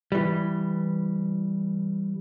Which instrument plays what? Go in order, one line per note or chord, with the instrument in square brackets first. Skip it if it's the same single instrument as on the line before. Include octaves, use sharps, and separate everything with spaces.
[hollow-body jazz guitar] E3 G3